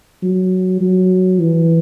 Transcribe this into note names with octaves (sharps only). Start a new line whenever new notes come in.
F#3
F#3
E3